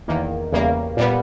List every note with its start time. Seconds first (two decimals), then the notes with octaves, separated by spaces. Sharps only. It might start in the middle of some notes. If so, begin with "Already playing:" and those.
0.08 E2 D#3 A#3
0.53 E2 C#3 G3 A#3
0.97 A#2 G3 B3